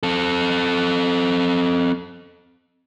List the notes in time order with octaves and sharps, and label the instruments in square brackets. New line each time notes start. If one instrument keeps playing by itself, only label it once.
[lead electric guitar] C4 A4